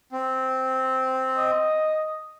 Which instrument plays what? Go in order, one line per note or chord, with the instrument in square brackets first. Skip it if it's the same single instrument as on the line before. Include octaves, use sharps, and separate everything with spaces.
[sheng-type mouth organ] C4
[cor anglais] D#5